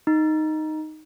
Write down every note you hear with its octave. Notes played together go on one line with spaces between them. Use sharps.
D#4